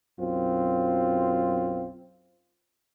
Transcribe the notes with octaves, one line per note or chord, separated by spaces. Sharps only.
B1 F#2 C4 F4